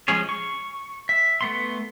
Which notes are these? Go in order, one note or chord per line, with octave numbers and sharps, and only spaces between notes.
F3 G#3 C#4 G#4 C#5
C#6
E5
A3 B3 C6